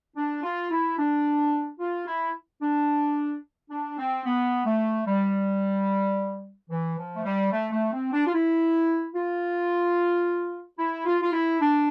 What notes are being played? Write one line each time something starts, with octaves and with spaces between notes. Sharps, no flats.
D4
F4
E4
D4
F4
E4
D4
D4
C4
B3
A3
G3
E3
F3
A3
G3
A3
A3
C4
D4
F4
E4
F4
E4
F4
F4
E4
D4